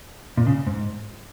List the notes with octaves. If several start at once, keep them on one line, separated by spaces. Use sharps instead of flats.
A#2
C#3
G#2